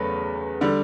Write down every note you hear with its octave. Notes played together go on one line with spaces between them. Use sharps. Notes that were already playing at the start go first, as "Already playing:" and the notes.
Already playing: E2 C#3 F#3 A3 B4
D3 G3